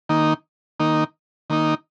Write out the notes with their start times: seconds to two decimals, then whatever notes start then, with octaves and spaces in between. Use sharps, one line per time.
0.09 D#3 A#3 D#4
0.80 D#3 A#3 D#4
1.50 D#3 A#3 D#4